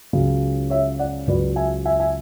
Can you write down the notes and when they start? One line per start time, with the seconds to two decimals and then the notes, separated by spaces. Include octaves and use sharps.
0.13 C#2 C#3 F#3
0.70 C#5 E5
0.99 D5 F#5
1.28 C#2 C#3 F#3 B4 D5
1.56 E5 G#5
1.85 E5 G#5
2.00 E5 G#5